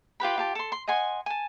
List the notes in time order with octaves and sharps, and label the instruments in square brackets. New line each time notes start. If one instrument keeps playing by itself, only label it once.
[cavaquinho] F4 G4 B4 B5
F4 G4 A5
A4 C6
C6
D#5 F#5 G#5 C6
G#5 A5